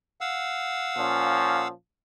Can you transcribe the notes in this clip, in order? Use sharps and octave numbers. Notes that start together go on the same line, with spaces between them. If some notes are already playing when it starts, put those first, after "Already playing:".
F5 F#5 E6
A#2 F3 C#4